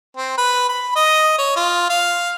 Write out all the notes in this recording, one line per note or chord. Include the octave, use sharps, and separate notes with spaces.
C4
B4
B5
D#5
C#5
F4
F5